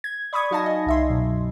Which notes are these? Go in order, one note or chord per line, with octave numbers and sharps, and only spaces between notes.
G#6
D5 B5 C#6 D#6 G#6
F#3 D#4 F5 G#5 A5 A#6
D#5
C2 E5 C6
F#2 B2 F#3